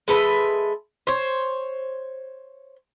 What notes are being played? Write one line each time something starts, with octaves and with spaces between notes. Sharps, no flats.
G#3 A4 B4 E5
C5 C#5